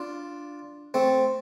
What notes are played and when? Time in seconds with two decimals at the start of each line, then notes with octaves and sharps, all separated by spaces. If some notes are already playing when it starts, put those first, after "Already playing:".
Already playing: D4 F4
0.94 A3 C4